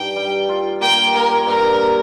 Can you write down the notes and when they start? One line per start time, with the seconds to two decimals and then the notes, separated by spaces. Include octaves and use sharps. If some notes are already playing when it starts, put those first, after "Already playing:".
Already playing: G2 D#4 G5
0.16 G3
0.49 F4
0.81 A#3 G5
1.14 A#3 A#4
1.46 G2 A#4